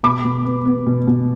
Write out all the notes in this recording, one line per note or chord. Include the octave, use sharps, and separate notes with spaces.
B2 B5 D6
B2
B3
B3
B2
B2